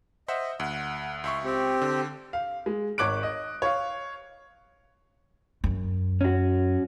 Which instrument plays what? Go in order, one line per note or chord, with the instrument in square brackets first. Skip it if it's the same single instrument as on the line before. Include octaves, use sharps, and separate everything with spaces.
[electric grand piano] C5 E5 F#5 [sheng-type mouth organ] D#5
[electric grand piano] D2 [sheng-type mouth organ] F#5
[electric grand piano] C#2 E5 C#6 [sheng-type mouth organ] C6
[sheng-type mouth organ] C4 G4
[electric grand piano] D3
[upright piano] F5
G#3
G#1 C#5 D6 F#6 D7
D#5
C#5 F5
[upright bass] F#2
[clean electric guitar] C#4 F#4